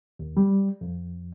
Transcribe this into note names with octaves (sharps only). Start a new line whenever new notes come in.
D#2
G3
F2